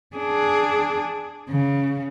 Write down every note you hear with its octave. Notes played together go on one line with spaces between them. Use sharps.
D4 G#4
C#3